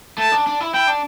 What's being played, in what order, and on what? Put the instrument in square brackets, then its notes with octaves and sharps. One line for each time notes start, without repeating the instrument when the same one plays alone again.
[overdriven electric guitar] A3 [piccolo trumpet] A5
[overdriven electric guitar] D4
D4
E4
[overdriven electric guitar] E4 [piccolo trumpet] G5
[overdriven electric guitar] D4